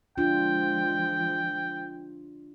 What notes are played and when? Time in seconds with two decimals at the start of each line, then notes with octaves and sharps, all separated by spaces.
0.18 F3 G#3 D4 F4 G5